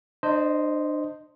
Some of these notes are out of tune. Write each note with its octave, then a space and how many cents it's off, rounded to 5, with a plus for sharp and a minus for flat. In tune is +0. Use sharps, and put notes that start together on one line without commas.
D4 +35 C5 -5 D#5 +0